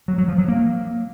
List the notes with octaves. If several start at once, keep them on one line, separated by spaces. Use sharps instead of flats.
F#3
F#3
F3
F#3
A#3